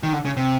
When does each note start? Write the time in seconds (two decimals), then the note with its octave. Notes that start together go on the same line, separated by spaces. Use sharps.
0.03 D#3
0.13 D3
0.25 C#3
0.37 C3